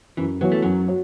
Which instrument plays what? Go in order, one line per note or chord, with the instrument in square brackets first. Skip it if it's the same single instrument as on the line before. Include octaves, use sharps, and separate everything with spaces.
[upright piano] F#2 [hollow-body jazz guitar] E3
[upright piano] E3 B3 F#4 C#5 [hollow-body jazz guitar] F#3
[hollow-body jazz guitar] A3
[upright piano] F#2 [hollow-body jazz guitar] F#3
[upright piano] F#4 C#5